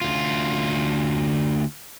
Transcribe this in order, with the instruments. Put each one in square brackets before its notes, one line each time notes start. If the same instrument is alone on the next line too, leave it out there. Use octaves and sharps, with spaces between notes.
[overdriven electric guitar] D2 F4